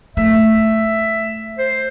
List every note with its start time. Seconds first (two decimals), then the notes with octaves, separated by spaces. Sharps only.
0.17 A3 E5
1.59 C5